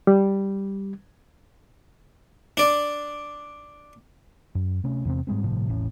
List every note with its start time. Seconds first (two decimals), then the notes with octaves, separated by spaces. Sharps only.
0.07 G3
2.57 D4 D5
4.55 F#2
4.84 C3 A3 C#4
5.05 E2 C3 C4
5.27 G#2 G3 G#3 C4
5.44 G1 A2 C3 F3
5.67 E1 A1 A2 C#4